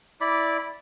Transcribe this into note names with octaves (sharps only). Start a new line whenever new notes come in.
E4 D5 B5 D6